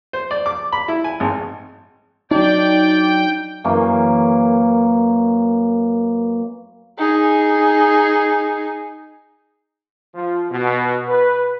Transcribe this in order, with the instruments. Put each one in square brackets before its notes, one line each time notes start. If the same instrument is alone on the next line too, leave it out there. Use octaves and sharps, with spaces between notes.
[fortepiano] C5
D5
D6
B5
E4
G#5
G#1
[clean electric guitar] F#3 D4 [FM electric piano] D#4 [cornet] D5 [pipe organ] G5
[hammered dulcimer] F#2 E3 A#3
[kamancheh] D#4 G#4
[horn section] F3
B2
B4